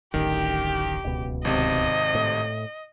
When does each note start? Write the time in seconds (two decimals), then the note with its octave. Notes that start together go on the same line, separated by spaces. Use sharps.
0.14 D1 A1 D3 D#3 G4
1.03 D1 C#2 B2
1.45 G#1 C3 D#5
2.14 A2